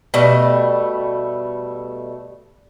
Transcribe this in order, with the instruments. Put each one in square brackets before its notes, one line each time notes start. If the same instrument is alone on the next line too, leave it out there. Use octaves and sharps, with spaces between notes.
[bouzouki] B2 G3 A3